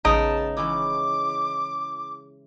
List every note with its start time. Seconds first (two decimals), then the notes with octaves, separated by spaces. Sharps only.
0.05 A1 C#3 G#3 B3 D#4 A5 D7
0.57 E3 C#4 E4 D6